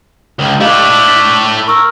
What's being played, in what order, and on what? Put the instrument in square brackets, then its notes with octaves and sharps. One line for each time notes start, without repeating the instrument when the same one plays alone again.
[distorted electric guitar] C#2
[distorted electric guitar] A3 E4 [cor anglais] D4 [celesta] G4 D#5 F5
[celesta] B6
[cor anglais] A#4 [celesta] C#6 E6